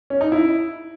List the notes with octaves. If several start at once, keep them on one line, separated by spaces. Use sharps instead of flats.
C#4
D#4
E4